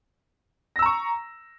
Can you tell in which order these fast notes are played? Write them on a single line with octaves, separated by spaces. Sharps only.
A#6 E6 A#5 C#6